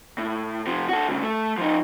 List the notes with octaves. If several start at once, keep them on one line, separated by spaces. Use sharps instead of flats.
A2
C3 F3
F#4 A4
D2 C#3
A3
F3 D#4